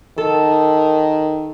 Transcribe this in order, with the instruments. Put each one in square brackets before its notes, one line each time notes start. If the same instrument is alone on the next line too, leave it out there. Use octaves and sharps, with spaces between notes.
[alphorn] D#3 [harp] A4